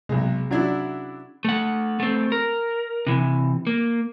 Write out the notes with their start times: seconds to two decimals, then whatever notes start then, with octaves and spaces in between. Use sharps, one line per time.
0.09 B1 C3 G#3 G#4
0.51 F#3 C#4 D4 E4 F#5 G#6
1.45 A3 F#5
2.00 A3 C4
2.32 A#4
3.07 C3 E3
3.67 A#3